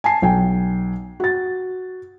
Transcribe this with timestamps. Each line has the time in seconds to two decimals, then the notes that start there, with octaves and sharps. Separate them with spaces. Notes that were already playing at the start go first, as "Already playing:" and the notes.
0.04 G#5 A5 C7
0.22 B1 G5 G#5
1.20 F#4 A6